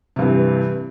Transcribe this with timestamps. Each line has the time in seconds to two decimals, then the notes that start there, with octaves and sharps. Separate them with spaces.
0.16 C3
0.19 G2
0.21 E3